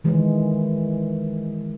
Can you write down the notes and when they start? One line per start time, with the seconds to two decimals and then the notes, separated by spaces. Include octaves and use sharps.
0.04 D#3 E3 G#3